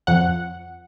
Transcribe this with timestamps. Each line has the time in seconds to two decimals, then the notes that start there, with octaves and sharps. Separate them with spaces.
0.07 F2 F#5